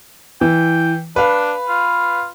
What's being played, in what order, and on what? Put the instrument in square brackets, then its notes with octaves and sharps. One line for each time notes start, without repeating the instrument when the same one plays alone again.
[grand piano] E3 [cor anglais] G5
[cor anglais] D4 [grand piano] B4 F5
[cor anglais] F4